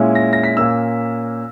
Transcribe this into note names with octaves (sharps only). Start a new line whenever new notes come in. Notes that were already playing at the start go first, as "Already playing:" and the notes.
Already playing: A#2 G#3 C#4 E4
A#6
A#6
B6
A#2 A#3 C#4 E6